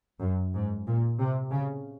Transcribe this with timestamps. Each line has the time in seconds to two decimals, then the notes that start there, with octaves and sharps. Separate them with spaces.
0.21 F#2
0.54 G#2
0.87 A#2
1.19 C3
1.51 C#3